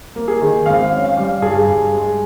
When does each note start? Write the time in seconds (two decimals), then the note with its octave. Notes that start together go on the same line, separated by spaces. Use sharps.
0.16 A#3
0.28 G#4
0.41 D#3
0.66 G#1 F5
0.92 C#4
1.05 F5
1.17 G3
1.42 G2 G#4
1.68 G2
1.93 G#3